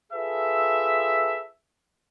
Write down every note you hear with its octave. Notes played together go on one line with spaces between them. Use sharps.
F4 G#4 A4 B4 E5